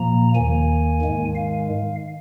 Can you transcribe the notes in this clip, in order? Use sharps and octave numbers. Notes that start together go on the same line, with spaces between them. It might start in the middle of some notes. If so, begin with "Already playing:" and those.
Already playing: A#2 F3 A#3 A#5
D#2 D#3 A#3 G#5
G#2 D#3 G#3
F5